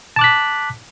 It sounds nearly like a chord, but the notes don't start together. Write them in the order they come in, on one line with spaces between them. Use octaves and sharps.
A5 D6 F#6 B6